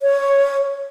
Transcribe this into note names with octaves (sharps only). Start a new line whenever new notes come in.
C#5